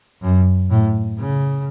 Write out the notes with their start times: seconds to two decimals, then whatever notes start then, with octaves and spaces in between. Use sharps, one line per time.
0.23 F#2
0.70 A2
1.19 C#3